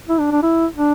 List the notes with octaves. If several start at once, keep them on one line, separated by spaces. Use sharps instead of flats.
E4
D4
D4
E4
D4